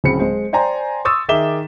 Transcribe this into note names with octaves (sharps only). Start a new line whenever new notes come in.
D1 C#3 C4 B5 C#7
G#3 C5
C5 D5 G5 G#5 A#5 C6
C6 C#6 D#6 E6 A6
D#3 G#4 E5 D6 E7 G7